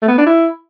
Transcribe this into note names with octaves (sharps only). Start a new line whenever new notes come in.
A3
B3
D4
E4